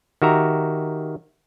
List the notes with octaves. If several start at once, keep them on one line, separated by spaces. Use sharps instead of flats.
D#3 F#4 G4 E5 A#5